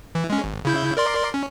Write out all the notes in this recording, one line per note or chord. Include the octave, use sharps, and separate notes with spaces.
E3
G#3 C#4
G#1
C#3 E4 G6
A#4 D5 C6
C#4